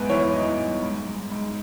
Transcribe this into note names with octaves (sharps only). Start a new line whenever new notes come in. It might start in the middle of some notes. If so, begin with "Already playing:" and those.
Already playing: E2 G#2 B4
E3 C#5
E3 D#5
G#2
G#2
G#2
G#2